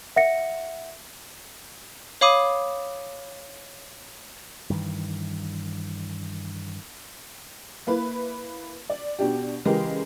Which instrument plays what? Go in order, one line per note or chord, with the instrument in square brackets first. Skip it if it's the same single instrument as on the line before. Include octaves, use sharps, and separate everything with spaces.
[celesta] E5 F#5 A#6 C#7
[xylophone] C#5 F5 B5 D6 D#6 D#7
[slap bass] G2 D#3 E3
[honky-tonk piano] A#3 E4 B4
D5
B2 D4 G4
C#3 E3 G#3 G4 A#4